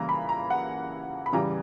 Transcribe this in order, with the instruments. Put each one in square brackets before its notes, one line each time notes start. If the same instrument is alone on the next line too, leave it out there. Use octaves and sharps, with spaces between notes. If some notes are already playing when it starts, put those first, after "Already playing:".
Already playing: [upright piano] C#3 E3 G3 A#3 A#5
B5
A#5
F#5
B5
C#3 E3 G3 A#5